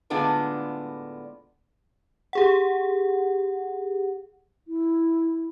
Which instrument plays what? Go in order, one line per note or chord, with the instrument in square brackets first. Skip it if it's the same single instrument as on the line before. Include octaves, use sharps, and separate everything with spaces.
[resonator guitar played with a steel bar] A2 D3 G#3 B3 D4 F4
[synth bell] G4 G#4 F#5
[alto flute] E4